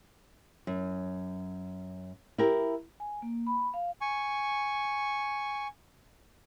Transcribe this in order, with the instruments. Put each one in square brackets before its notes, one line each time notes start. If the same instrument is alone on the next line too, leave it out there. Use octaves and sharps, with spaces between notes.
[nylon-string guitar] F#2
E4 G4 A#4
[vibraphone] G#5
A#3
B5
F5
[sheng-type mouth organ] G#5 C#6